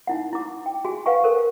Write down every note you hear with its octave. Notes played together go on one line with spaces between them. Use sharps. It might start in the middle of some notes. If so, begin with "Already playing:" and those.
D#4 E4 F#5
E4 D6
G5
F#4 G#4 G#5
B4 F5 F#5 G#5 C#6
A4 A#4 C5